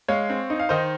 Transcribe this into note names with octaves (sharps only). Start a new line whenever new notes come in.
G#3 C#5 F5
C4
D#4
F5
D#3 C5 D#5